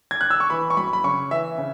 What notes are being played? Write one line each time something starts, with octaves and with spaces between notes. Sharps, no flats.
G#6
F#6
E6
C#6
E3 B5
C#6
F#2 B5
B5
C#3 C#6
E3 E5
C#3